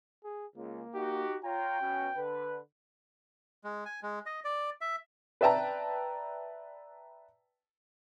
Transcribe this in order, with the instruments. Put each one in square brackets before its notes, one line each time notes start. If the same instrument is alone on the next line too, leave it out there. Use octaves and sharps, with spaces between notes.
[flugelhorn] G#4
[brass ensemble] C#2 [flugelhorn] A#3
[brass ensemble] D#4 F#4 G4
[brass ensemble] F4 C#5 A#5 [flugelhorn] G5
[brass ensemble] B2 C#4
D3 B4
[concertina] G#3
G#5
G#3
D#5
D5
E5
[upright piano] B4 D5 E5 G5 A5 A#5